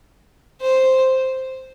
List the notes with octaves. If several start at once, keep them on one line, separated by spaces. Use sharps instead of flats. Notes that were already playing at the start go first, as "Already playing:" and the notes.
C5